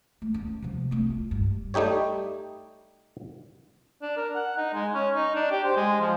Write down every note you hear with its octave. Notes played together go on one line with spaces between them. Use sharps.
A3
C#4
C3 F3
A3 C4
F4
G2
G3 A3 D#4 G4 C#5
D4
A#4
F#5
D#4
G#3
C#4
D#4
D4
G4
C5
G#3
F3